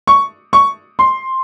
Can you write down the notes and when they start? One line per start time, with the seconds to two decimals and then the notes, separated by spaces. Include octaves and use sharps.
0.07 C#6
0.53 C#6
0.99 C6